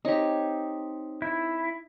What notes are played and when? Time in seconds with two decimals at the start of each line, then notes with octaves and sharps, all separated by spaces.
0.05 C4 D#4 G4 C#5
1.22 E4